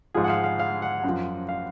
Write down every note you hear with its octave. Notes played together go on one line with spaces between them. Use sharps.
G#2 F3 G#4
F#5
F5
F5
F5
F#5
F#2
F3
F5